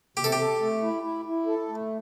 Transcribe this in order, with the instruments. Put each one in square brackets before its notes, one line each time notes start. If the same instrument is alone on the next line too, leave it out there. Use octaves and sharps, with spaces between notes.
[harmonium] C3 [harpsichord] G4
[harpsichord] A4
G4
[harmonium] A4
A3
E4
E4
E4
A4
A3